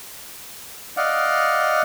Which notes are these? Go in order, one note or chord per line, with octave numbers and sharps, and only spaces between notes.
D5 D#5 F5 F#5